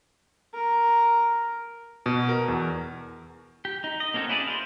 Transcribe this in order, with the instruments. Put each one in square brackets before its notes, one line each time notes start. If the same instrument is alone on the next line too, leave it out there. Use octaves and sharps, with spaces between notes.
[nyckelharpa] A#4
[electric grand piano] B2
A#4
E2
[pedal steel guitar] G4
D#4
D#5
A#3 C4 C#4 F#4 A4
E4 G#4 B4 D5
C5 F5